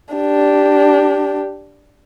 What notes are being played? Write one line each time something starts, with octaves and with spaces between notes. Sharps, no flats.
D4 G4